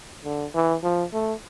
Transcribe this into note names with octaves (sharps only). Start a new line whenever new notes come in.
D3
E3
F3
A3